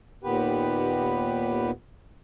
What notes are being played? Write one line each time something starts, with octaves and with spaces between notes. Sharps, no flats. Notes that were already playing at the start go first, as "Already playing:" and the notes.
D#2 A#2 D#3 B3 G4 B4